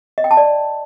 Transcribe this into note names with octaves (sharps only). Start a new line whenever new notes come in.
D#5
G5
A5
D5